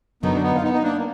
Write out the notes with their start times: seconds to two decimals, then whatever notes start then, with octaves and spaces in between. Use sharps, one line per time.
0.23 F#2 D3 F#3 B3 D#4
0.34 D4
0.42 B3 D#4
0.56 F4
0.63 B3 D#4
0.73 D#4
0.83 A#3 D4
0.98 A#3